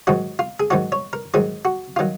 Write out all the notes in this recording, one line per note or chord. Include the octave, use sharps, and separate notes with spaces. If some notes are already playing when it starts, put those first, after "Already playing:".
G#2 D#3 F#3 F#4
F4
G#4
G#2 D#3 F#3 F#4
C#5
A#4
G#2 D#3 F#3 G#4
F#4
D#3 F#3 F4